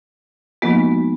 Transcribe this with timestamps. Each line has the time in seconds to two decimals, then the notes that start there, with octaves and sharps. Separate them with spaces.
0.62 F3 G#3 A#3 B3 D#4 F#4